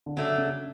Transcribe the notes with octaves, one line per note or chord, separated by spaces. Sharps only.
D3
C#3 F#3 A3 D4
C#3